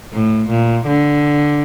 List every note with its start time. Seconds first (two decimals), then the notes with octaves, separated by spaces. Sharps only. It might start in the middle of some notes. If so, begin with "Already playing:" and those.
0.13 A2
0.50 A#2
0.87 D3